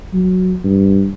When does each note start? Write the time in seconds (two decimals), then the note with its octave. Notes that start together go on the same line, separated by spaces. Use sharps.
0.13 F#3
0.64 G2